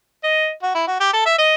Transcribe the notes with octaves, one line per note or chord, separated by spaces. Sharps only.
D#5
F#4
E4
F#4
G4
A4
E5
D#5